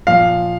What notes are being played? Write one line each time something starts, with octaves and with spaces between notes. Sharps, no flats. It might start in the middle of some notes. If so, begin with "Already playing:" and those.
A#2 F3 F5